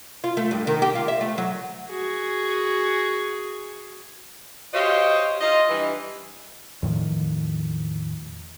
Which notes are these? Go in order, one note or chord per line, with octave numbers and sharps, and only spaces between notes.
F4
A3
G2
D#3
G4
F4
E5
A3
F#3
F#4 G#4
F#4 G4 C5 C#5 D#5 F5
F4 D#5
G2 E3
E2 A2 D#3 F3